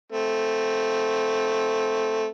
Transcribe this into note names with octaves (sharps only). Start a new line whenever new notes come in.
A3 C4